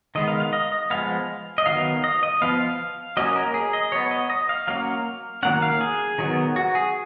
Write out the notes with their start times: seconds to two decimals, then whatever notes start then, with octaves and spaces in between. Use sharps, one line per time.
0.15 D#3 G#3 B3 D#5
0.28 F5
0.40 F5
0.53 D#5
0.72 D#5
0.90 F3 G#3 B3 F5
1.58 D#5
1.66 D#3 F#3 B3 F5
2.04 D#5
2.23 D#5
2.42 F3 B3 F5
2.60 F5
3.17 F#3 A#3 C#4 D#5
3.36 A#4
3.54 G#4
3.73 D#5
3.92 F#3 B3 C#5
4.11 D#5
4.30 D#5
4.49 F5
4.67 F#3 A#3 C#4 F5
5.43 D#3 F#3 A#3 C#4 F#5
5.62 F5
5.81 G#4
6.18 D#3 F#3 B3
6.56 F#4
6.75 G#4